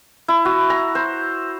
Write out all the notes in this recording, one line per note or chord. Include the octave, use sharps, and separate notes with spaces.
E4
F#4
A#5
C5